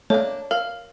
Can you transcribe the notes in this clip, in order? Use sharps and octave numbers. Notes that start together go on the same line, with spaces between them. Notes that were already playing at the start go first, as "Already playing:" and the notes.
A3 A#3 D4 C#5
A#4 F5